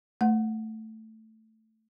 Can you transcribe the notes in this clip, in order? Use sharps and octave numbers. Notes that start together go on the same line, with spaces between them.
A3 F#5